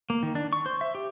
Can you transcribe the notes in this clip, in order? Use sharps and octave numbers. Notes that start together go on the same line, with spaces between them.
A#3
D#3
D4
C#6
C5
E5
G4